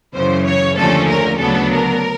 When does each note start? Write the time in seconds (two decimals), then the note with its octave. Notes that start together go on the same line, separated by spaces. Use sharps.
0.14 F#2 C#3 E3 C5
0.47 C#5
0.77 D#2 D3 F3 A3 C#4 A4
1.09 A#4
1.40 D2 C#3 F#3 B3 D4 A4
1.72 A#4